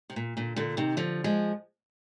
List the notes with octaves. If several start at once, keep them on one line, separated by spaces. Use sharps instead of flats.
C3
A#2
A#2 D3
A#2 D3
C3 D#3
D3 F3
F3 G#3